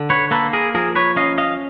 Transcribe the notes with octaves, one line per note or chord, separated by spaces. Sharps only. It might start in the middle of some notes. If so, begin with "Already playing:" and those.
Already playing: D3
B4 C#5
A#3 A4 B4
G#4 A#4
F3 G#4 A#4
B4 C#5
C#4 D#5 F5
D#5 F5